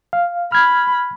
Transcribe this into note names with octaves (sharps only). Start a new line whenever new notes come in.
F5
B5 F6 G#6